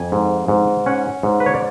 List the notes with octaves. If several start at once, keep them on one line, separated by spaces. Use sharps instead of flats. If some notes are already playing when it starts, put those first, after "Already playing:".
Already playing: F2 G#5
G#2
G#2
C#4 F#5
G#2
B4
C#5
D5